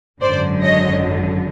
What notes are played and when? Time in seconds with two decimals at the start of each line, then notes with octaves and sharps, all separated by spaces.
0.22 G#1 F#2 D3 C5 D5
0.62 C#5 D#5